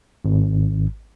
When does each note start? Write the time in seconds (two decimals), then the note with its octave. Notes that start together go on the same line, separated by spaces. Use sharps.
0.25 G#1